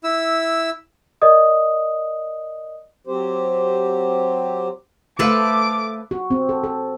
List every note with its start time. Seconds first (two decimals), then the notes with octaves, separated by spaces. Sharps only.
0.04 E4 E6
1.22 A#4 D5 D#5 D#6
3.07 F#3 C4 G4 C5
5.19 A3 A4 B4 C5 F5 D6
6.11 F#4
6.30 C4
6.49 A4
6.64 A4